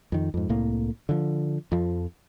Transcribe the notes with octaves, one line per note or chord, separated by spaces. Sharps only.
F2 D#3
F2 G#2
C2 A2 A#3
D3 F3
F2 F3